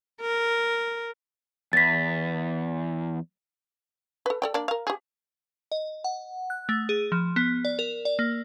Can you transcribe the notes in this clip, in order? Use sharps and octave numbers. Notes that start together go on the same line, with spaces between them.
A#4
E2 A6 B6
A4 B4
A4 D5 G5
A#3 D4 D5
A#4 F5
G4 G#4
D#5
F#5
F#6
A3
G#4
F3
B3
D5
A#4
D5
A#3